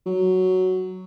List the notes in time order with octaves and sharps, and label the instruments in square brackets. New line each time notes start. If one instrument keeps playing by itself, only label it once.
[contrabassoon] F#3